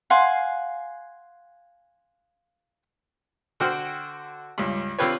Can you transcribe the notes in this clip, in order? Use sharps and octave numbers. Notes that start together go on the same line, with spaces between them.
F5 F#5 G#5 C6
D3 F#4 C5 G5 F6
C#2 G2
D3 C4 F4 G4 B4 C#5